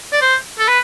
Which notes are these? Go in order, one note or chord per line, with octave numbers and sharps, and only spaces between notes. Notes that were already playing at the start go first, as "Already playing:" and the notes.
D5
C5
A4
B4